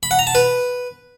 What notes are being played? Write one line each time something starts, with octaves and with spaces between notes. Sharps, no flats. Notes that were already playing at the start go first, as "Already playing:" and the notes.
B5
F#5
A#5
A5
B4